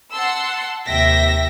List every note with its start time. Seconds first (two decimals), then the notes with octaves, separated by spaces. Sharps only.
0.12 F#5 A5 C6 E6
0.86 D#2 C3 E5 G5 A#6 B6